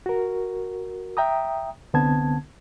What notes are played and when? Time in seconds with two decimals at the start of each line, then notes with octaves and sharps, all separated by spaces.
0.06 F#4 A#4
1.17 E5 G5 A#5 D#6
1.94 C2 D3 B3 C4 A5 G#6